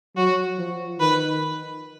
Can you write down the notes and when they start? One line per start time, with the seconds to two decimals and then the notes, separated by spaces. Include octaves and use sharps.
0.17 F#3 F#4
0.58 F3
1.00 D#3 B4